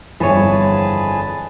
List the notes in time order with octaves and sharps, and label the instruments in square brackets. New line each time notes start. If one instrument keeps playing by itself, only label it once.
[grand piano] G1 F2 [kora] E3 C#5 [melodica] G#4 B4 A5